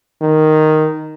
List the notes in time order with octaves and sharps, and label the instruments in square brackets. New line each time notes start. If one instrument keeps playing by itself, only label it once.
[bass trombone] D#3